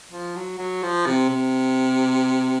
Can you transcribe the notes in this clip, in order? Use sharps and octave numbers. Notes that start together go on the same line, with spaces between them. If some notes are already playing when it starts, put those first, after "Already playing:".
F3
F#3
F#3
F3
C3
C3